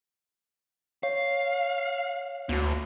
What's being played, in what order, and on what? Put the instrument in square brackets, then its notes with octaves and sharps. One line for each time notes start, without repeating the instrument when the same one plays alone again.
[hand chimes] C#5 [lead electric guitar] F5
[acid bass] D2 [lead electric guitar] A#3 F#4